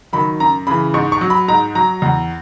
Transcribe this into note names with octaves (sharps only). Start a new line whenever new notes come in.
D#3 F#3 B5
F#2 A#5
C#3 E3 B5
G#2 C#6
C#6
F#3
B5
G#2 A#5
F#3 A#5
E2